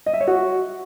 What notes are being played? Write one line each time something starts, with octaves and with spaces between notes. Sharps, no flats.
D#5
E5
C#5
F#4